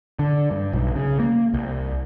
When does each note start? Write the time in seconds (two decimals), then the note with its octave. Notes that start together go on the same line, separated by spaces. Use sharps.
0.19 D3
0.51 G2
0.73 B1
0.96 C#3
1.20 A#3
1.54 C2